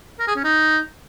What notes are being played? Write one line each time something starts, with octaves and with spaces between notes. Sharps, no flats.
A#4
G#4
C#4
D#4